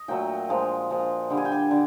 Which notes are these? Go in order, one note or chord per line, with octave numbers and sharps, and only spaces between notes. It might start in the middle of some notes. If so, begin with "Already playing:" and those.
Already playing: D#5
A#2 F#3 A3 G5
A#2 F3 G#3
A#2 F3 G#3
D3 G3
G#5
G5
G#5
D3